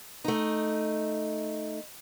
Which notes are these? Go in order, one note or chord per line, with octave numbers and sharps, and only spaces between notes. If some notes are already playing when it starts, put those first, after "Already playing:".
A3 D#4